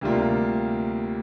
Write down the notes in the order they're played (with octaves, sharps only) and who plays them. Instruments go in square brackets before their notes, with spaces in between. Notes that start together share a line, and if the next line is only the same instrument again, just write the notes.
[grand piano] D2 C3 G3 A#3 F4